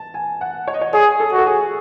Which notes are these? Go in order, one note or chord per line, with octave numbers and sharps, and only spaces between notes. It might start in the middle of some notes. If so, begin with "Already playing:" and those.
Already playing: A5
G#5
F#5
C#5
D#5
C#5
G#4 C#5
A4
F#4
A4
G#4